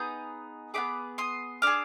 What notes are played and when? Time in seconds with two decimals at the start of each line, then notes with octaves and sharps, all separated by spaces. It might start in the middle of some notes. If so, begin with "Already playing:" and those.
Already playing: B3 D#4 G#4 D#6 G6
0.74 B3 D#4 G#4 B5 D6
1.18 C6 D#6
1.62 D4 G#4 D6 F6